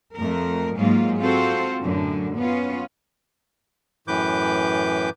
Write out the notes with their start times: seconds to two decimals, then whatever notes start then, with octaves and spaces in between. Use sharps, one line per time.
0.15 F2 A3 A#4
0.77 G#2 F#3 G#3 A#3 F4
1.19 C4 F4 F#4 A4 C5
1.83 F#2 A2 D3
2.36 B3 C#4 F4
4.08 F#2 A2 E3 B4 D6 G6